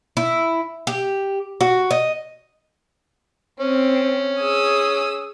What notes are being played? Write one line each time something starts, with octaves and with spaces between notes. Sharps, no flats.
E4
G4
F#4
D#5
C4 C#4
G#4 D#6 E6